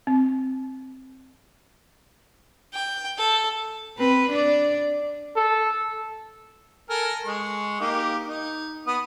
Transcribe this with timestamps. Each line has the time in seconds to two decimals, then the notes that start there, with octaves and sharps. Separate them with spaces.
0.07 C4
2.73 G5
3.18 A4
3.97 C4 B4
4.30 D4 D5
5.36 A4
6.90 A4 A#4 G#5
7.24 G#3 C#6
7.80 A#3 D#4 G4
8.26 D#4
8.87 B3 D#6